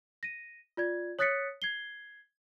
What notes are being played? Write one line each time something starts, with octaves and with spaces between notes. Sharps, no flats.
A#6 D#7
F4 D5 G#6
C#5 D#6 F#6 A6 B6 C#7
G#6 C7 G7